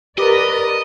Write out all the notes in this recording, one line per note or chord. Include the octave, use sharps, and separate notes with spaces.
G4 A#4 B4 D5 D#5 D6